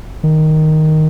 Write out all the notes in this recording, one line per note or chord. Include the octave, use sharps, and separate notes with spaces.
D#3